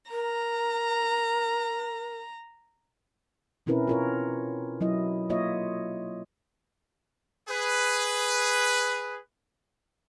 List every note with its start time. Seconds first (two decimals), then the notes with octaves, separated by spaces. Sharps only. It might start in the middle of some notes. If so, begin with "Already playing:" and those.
0.11 A#4 A#5
3.66 B2 C4 C#4 E4 A#4 B4
3.87 F4 A#4 C#5
4.81 F#3 E4 D#5
5.30 A#3 F4 C#5 D#5 E5
7.49 G#4 B4